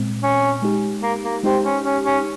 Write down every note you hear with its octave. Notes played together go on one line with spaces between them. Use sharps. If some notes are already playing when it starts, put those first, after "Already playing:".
Already playing: A#2 G#3 C4
C#4
G#3 D#4 G4
A#3
A#3
G#3 C4 D#4 G4
C#4
C#4
C#4